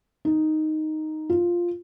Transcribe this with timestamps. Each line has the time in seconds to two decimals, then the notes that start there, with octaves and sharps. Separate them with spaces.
0.25 D#4
1.30 F4